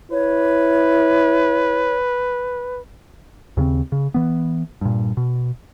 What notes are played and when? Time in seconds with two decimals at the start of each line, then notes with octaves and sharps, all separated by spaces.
0.12 E4 B4 C#5
3.57 D#2 C#3 A3 C4
3.92 C#3
4.14 E3 B3
4.81 G2 A#2
5.17 B2